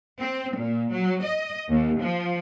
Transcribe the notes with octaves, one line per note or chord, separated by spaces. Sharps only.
C4
A#2
F#3
D#5
D#2
F3